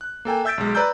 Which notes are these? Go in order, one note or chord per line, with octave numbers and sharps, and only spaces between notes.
F#6
A#3 A4 G5 G#5
E5 E6 G6 A6 B6 D7
B1 G#3
B4 D5 A#5 E6 G6